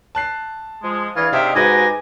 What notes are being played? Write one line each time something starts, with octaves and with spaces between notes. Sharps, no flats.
A5 F#6 C7
F3 G#3
E3 D4 G#4 F5 G#6
C3 D#4 E5 G5
G#2 F#4 G4 B4 G#5 D#6 A#6